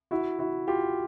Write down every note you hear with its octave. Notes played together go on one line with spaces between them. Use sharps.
E4 F#4
E4 F#4
F4 G4